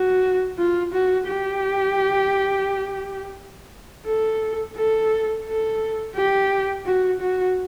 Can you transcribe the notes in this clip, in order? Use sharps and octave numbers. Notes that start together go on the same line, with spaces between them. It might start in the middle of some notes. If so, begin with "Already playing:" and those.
Already playing: F#4
F4
F#4
G4
A4
A4
A4
G4
F#4
F#4